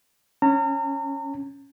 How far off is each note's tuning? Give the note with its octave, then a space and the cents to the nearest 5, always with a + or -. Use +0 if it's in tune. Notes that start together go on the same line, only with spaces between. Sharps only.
C#4 -10 A#5 -40